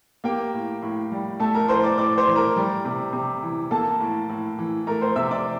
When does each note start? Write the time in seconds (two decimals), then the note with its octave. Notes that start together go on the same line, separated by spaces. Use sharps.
0.24 A#3 G4 G5
0.53 A2
0.82 A2
1.12 G3
1.40 A3 A4 A5
1.55 A#4 A#5
1.68 A2 C5 C6
1.84 D5 D6
1.98 A2 D5 D6
2.18 C5 C6
2.26 E3
2.36 A#4 A#5
2.56 G3
2.85 C3
3.13 C3
3.43 E3
3.71 A#3 A4 A5
4.00 A2
4.29 A2
4.59 E3
4.87 A3 A#4 A#5
5.01 C5 C6
5.16 C3 E5 E6
5.31 D5 D6